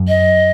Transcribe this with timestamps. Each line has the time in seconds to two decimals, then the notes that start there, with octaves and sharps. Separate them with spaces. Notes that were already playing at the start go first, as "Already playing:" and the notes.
Already playing: F#2
0.08 D#5